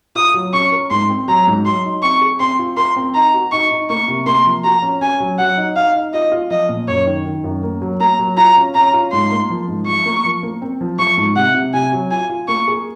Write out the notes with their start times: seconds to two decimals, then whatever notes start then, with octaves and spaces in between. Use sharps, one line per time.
0.15 F4 D#6
0.34 F#3
0.53 C#4 C#6
0.72 A#4
0.91 G#2 C6
1.09 C4
1.28 F#3 A#5
1.47 G#2
1.66 F#3 C6
1.85 D#4
2.03 C4 C#6
2.21 G#4
2.40 C4 C6
2.59 F4
2.77 A#4 C6
2.96 C4
3.15 D#4 A#5
3.34 F#4
3.52 D#4 C#6
3.71 D#4
3.90 A#3 C#6
4.08 C3
4.26 A#3 C6
4.46 F3
4.64 F#4 A#5
4.82 C#4
5.01 C#4 G#5
5.20 F#3
5.39 F#3 F#5
5.57 D#4
5.76 D#4 F5
5.95 D#4
6.14 F4 D#5
6.32 F4
6.51 F3 D#5
6.69 A#2
6.88 F#2 C#5
7.07 D#3
7.26 D#3
7.44 F#2
7.63 A#3
7.82 F#3
8.00 A#3 A#5
8.19 F#3
8.37 F4 A#5
8.56 C#4
8.75 C#4 A#5
8.94 F4
9.12 G#2 C6
9.31 A#3
9.50 F3
9.68 G#2
9.86 F3 C#6
10.06 A#3
10.25 F3
10.43 A#3
10.62 C4
10.81 F3
10.99 F3 C#6
11.17 G#2
11.36 C3 F#5
11.55 C3
11.74 C3 G#5
11.92 F#3
12.11 F4 G#5
12.29 F4
12.48 A#3 C#6
12.68 G#4